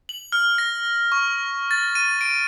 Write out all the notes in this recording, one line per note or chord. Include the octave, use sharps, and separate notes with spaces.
F#7
F6
A#6
C#6
A6
D#7
D7